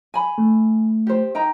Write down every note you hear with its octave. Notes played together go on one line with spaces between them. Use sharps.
G#5 B5
A3
G4 C5
D#4 G5 A#5